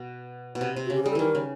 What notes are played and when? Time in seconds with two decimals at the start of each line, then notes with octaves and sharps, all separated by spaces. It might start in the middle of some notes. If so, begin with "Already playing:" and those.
Already playing: B2
0.55 B2
0.61 C3
0.76 C3
0.86 F#4
0.90 C#3 G4
1.03 G3 G#4
1.11 A4
1.15 D#3 E3 A#4
1.35 C#3